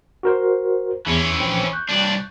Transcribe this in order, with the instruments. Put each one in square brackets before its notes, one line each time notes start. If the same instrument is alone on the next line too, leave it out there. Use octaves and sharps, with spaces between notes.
[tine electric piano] F#4 A#4 C5
[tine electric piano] E2 [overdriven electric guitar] E3 C#4
[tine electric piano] A#1 C4
C#6 F#6 G6
[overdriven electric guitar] C2 D4